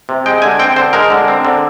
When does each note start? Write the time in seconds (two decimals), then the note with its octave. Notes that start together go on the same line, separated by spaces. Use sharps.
0.09 C3
0.26 G#3 G5
0.42 D3 G#5
0.59 C4 G5
0.76 D3 C5
0.93 G#3 A#4
1.10 D3
1.28 C4
1.45 D3